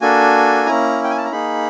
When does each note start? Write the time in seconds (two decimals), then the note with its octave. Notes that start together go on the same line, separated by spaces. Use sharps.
0.01 A#3 D4 F#4 A4 G#5
0.66 A#3 C#4 E4 A#5
1.04 G5
1.10 G#5
1.17 A5
1.25 A#5
1.32 A#3 D#4 G#4 B5